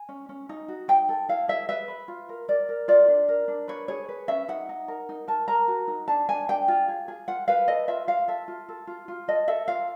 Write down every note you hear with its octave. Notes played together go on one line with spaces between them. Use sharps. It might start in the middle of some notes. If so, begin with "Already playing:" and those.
Already playing: G#5
C#4
C#4
D#4
F#4
D#4 G5
A4
E4 F5
G#4 E5
B4 E5
B4
F4
A#4
A#4 D5
A#4
F4 D5
D4
A#4
D4
B4 C#5
G#4 C#5
B4
C#4 E5
D#4 F#5
D#4
A#4
D#4
A#4 A5
A#4 A#5
F#4
D#4
D4 A5
D4 G#5
D4 G5
F4
G#4
G#4
F4 F#5
B4 F5
A4 D#5
F4 E5
F4 F5
A4 E5
F4
A4
F4
F4
A4 D#5
A4 E5
F4 F5